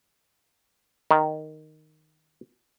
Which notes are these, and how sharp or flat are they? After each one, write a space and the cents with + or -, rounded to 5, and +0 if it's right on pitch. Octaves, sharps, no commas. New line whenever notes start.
D#3 -5